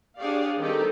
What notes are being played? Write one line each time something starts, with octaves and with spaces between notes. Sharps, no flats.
D4 G4 G#4 C#5 D5 F5
D#3 G3 C4 D#4 G4 A4